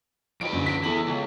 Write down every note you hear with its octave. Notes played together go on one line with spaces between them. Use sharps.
F2 B4 D7
F#2 D3
B6 D7
E3 B3 A4 F#7
C#2